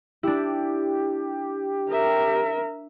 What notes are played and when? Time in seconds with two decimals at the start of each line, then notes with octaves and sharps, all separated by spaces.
0.23 D4 E4 G4
1.92 A#4 E5